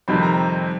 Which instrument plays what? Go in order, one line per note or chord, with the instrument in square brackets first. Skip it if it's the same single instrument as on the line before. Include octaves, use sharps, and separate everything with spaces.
[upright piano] F2 C3 D#3 G3 C4 B5
A#5